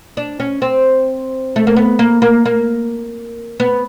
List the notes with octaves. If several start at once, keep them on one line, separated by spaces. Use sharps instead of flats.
D4
C#4
C4
A3
A#3
B3
A#3
A#3
A#3
B3